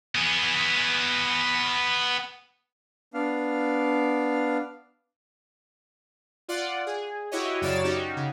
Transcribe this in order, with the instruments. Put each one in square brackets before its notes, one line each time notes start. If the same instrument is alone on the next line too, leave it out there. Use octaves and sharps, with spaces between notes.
[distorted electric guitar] B3 G#4
[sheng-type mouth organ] B3 D4 F5
[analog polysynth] F4 D5 F#5
G#4
E4 F#4 G4 C#5 D#5
F#2 C#3 C#5 D5 A6 E7
C#4 D#4 F#4 G4
C#3